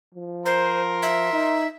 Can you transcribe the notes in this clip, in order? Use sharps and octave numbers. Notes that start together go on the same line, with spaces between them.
F3
A#4 C5 C6
E5
D#4